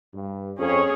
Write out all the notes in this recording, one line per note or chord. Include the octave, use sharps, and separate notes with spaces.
G2
F2 C#4 G#4 C#5